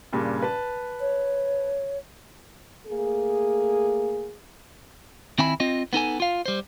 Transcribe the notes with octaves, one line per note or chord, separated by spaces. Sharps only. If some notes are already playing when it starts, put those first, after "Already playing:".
G2 A#2 C#3
B4 A5
C#5
A3 A#3 G#4
D#3 C4 E4 G#5 B5
C4 F4 D#5
B3 D#4 A4 G#5
F4 F5
G3 C5